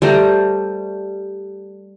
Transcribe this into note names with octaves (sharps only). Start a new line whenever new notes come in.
G3 A3 C5 A#5